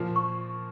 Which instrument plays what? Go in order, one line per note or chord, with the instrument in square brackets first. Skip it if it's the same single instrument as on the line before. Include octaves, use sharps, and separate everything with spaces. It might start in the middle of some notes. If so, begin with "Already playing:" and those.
Already playing: [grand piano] A#2 F3 A#3 F4
[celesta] C#6